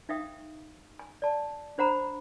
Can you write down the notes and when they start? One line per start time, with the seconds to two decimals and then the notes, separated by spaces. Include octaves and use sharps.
0.09 D#4 E5 F5 G5 D#6
0.99 G#5
1.22 D5 A5
1.78 D4 C5 F#5 A#5 B5